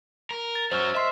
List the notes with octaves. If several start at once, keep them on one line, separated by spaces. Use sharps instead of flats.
A#4
A6
F#2 F#3 C5 E6 F6
D#5 E5 C6 C7